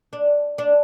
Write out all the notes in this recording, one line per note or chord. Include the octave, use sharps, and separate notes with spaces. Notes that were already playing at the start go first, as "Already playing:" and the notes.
D4
D4